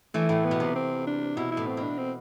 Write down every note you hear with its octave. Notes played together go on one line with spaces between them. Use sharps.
E3 A3
A2
B3
B2
C3
C4
D4
B2 E4
E4
A2
C4
B2
D4
C4